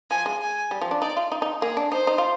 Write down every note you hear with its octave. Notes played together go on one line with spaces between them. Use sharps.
F3 G#5
G#3
G#5
G3
F3
D4
D#4 D5
F4
D#4
D#4
A#3 G#4
D4
D#4 C5
D#4
F4